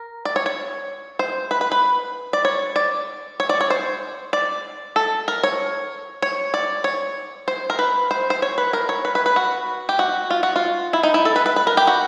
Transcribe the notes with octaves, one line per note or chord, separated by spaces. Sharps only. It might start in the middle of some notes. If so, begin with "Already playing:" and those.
Already playing: A#4
D5
C#5
C#5
C5
B4
B4
B4
D5
C#5
D5
C#5
D5
C#5
C5
D5
A4
A#4
C#5
C#5
D5
C#5
C5
A#4
B4
C5
C5
C#5
B4
A#4
C#5
B4
B4
B4
F#4
G4
F#4
F4
F#4
F4
E4
D#4
E4
A4
B4
B4
B4
A#4
G4
F#4